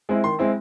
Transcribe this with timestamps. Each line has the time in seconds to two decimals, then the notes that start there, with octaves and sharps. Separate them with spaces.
0.09 G#3 C4 E4
0.24 D#3 C6
0.39 G#3 C4 E4